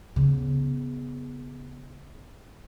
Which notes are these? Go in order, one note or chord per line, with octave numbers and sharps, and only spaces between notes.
C#3 B3